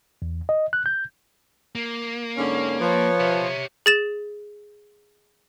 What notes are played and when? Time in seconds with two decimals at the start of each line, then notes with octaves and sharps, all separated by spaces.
0.22 E2
0.49 D#5
0.73 F#6
0.86 G6
1.75 A#3
2.37 G#2 D3 C#4
2.81 F3 B4 C#5
3.20 G4 E5
3.86 G#4 A6 E7